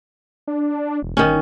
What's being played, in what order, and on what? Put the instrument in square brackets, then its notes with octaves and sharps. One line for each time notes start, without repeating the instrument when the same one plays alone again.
[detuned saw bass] D4
E1
[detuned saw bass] G1 [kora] D#3 C#4